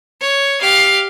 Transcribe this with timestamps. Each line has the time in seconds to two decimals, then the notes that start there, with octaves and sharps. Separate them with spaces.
0.21 C#5
0.60 G4 F5